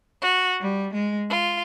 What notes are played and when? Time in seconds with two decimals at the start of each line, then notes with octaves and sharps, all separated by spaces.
0.21 F#4
0.61 G3
0.93 G#3
1.29 F4